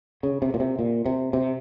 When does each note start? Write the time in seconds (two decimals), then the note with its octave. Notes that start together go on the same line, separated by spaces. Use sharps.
0.23 C#3
0.42 C3
0.54 A#2
0.60 C3
0.79 A#2
1.06 C3
1.33 C3